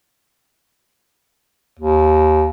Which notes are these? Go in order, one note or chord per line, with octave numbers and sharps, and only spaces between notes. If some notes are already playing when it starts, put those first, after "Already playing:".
D#2